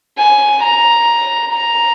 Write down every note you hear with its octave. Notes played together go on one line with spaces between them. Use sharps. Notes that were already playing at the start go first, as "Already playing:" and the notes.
G#5
A#5
A#5